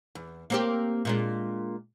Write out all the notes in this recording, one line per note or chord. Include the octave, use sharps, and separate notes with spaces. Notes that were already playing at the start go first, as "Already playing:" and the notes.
E2
A#3 C4 G4
A#2 G#3 D4